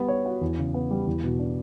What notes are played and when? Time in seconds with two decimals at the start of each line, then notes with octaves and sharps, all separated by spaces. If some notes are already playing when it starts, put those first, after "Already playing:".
Already playing: G3 B3
0.08 C#5
0.26 F#4
0.41 E2
0.59 C#3
0.74 B3
0.91 G3
1.07 E2
1.24 B2
1.39 D4